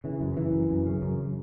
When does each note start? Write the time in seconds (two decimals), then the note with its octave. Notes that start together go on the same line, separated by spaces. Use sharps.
0.04 C#3 E3
0.21 F#2
0.37 F#2 E3
0.53 F#2
0.70 F#2
0.86 C#3
1.02 F#2